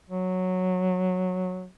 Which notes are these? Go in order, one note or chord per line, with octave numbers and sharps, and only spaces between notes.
F#3